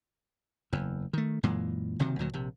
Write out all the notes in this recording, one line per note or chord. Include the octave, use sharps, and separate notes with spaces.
F#1 E2
D#3 A3
F#2 A#2 E3 G#3
F#1 C3 D#3 F#3
D2 A#2 F#3
A#1 C3